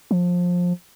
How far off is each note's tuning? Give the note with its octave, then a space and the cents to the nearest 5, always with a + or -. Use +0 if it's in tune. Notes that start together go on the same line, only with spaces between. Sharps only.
F3 +20